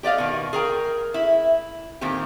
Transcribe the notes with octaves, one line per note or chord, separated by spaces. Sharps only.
G4 D5 D#5 F5
B2 D#3
G#4 A#4 G5
E4
A#2 D#3 C4 G4